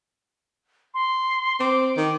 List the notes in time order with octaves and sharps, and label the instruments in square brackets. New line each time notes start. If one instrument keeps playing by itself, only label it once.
[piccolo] C6
[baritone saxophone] C4 [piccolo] D6
[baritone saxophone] D#3